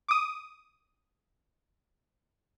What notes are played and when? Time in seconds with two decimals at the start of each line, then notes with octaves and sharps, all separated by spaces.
0.08 D6 D#6